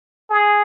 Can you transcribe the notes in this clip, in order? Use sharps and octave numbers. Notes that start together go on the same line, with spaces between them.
G#4